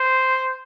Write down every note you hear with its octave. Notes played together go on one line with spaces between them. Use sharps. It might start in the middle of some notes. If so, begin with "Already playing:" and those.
Already playing: C5